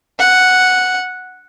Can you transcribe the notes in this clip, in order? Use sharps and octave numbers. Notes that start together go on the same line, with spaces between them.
F#5